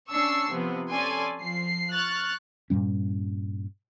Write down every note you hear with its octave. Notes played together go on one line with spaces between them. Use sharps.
C#4 D4 A5 C#6 E6 C7
C3 F3 B3
C#4 A4 D5 G#5 C6
F3 C7
C#6 F6 F#6 A6
G2 A#2 G3 C#4